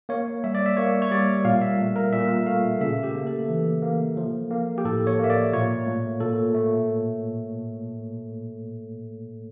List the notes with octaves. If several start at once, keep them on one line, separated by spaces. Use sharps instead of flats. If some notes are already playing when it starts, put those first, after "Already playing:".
A#3 C#5
G3 E5
D5
E5
A#3 C#5
C#5
G3 D5
A#2 F5
E5
A3
A#4
A#2 E5
A3 F5
C#3 E5
G4
A#3
A4
E3
A#3
F3
A#3
G4
A2 A4
C#5
A#3 E5
D5
A#2 C#5
A3
A#2 A4
A3